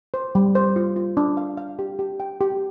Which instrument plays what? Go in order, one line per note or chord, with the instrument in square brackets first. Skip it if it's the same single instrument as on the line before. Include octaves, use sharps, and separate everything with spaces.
[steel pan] C5
G3
C5
F4
F4
D4
F5
F5
G4
G4
G5
G4